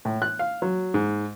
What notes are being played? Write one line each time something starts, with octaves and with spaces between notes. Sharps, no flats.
A2
F#6
F5
F#3
G#2